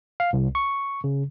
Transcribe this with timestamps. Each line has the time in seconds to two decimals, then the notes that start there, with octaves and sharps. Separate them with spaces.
0.20 F5
0.33 C2
0.55 C#6
1.04 C#3